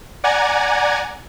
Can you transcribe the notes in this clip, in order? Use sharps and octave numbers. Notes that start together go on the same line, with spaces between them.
D5 F#5 G#5 A#5 G#6